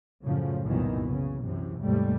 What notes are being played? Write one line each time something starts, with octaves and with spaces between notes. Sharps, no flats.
F#2 A2 C#3 F3
C2 F#2 A#2 D#3 E3 B3
C#3
F#2 C3 E3
D#2 G#2 C3 G3 A3